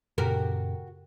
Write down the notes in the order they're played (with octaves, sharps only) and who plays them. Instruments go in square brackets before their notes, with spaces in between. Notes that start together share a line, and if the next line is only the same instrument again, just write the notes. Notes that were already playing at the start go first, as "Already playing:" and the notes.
[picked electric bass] F#2 A#2 C#3 [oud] F#4 G4 A#4